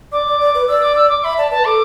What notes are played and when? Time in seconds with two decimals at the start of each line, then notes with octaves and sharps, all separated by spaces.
0.12 D5 D6
0.27 D5
0.40 D5
0.55 B4
0.68 D5 E6
0.82 D6
0.96 E6
1.09 D6
1.24 E5 B5
1.38 D5 A5
1.51 B4 A5
1.65 A4 D6